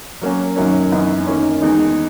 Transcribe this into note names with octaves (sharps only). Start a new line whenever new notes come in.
F#3 A#3 C#4
F#2 D#3 F#3 A#3 C#4
F#2 E3 B3 D#4
D#3 A#3 C#4
E2 D#3 G#3 D#4